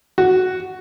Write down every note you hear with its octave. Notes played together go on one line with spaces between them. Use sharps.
F#4